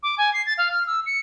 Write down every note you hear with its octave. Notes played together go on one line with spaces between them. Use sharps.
D6
G#5
C7
A6
F5
F6
E6
C#7